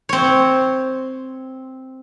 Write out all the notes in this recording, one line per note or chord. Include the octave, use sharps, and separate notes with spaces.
C4 C#5